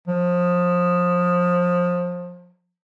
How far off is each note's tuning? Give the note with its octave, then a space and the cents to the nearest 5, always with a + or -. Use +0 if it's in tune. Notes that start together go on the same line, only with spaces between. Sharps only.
F3 +25